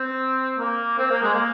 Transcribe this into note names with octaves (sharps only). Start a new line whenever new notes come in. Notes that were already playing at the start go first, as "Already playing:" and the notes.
Already playing: C4
A#3
C4
A#3
G#3
A#3